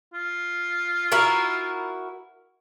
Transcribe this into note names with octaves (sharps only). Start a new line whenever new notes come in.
F4
E4 F#4 A#4